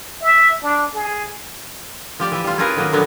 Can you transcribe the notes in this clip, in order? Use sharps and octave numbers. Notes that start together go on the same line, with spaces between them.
E5
D4
G#4
F3 G4 D5
E3 E5
G3 F4
C#4 E4 F4 G#4 A#4 B4
D#3 F#3 A#3
A#2 D3 F3 F#3 B3